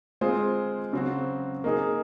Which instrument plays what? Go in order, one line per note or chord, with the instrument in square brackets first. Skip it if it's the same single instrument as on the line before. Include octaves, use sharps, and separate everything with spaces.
[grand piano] G#3 C4 F4 G#4 C5
C#3 F#3 C4 F#4
A#3 D#4 G#4